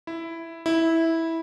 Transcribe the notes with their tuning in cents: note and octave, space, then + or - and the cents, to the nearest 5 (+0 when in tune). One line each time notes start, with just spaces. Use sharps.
E4 +5
E4 -10